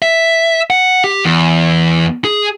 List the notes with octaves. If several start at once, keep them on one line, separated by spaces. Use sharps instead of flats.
E5
F#5
G4
E2
G#4